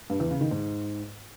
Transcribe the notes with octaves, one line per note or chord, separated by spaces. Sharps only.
G2
E2
C#3
D#3
G#2